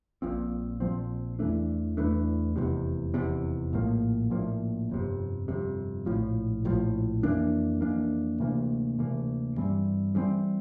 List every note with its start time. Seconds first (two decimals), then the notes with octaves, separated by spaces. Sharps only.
0.22 A#1 A#2 F3 C4
0.80 A#1 A#2 F3 C4
1.39 E2 E3 A3 D4
1.97 E2 E3 A3 D4
2.56 F1 E2 C3
3.14 F1 E2 C3
3.73 A#1 A2 F3 A#3
4.30 A#1 A2 F3 A#3
4.90 G1 F2 C3
5.48 G1 F2 C3
6.06 A#1 A2 F3
6.65 A#1 A2 F3
7.23 F2 E3 A#3 D4
7.81 F2 E3 A#3 D4
8.40 D2 C3 E3 A#3
8.98 D2 C3 E3 A#3
9.57 G2 E3 G3 C4
10.15 G2 E3 G3 C4